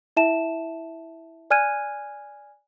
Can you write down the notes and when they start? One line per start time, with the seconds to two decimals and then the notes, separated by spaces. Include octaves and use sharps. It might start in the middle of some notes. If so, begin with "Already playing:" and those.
0.17 E4 E5 A5 E7
1.51 D5 G#5 F6 F#6 G#6 D#7